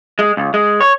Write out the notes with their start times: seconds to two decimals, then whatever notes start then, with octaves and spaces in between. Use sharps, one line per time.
0.19 G#3
0.37 C#2
0.54 G#3
0.81 C#5